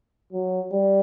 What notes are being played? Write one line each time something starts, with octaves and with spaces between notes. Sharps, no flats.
F#3
G3